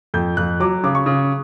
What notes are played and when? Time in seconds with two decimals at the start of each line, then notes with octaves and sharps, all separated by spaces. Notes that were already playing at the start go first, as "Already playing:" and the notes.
0.14 F2 G6
0.37 F2 F#6
0.60 F#3 D6
0.84 C#3 D6
0.95 C#6
1.06 C#3